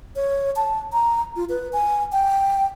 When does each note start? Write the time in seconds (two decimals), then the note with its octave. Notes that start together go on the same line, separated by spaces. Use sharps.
0.16 C#5
0.56 A5
0.93 A#5
1.36 F4
1.49 B4
1.73 G#5
2.12 G5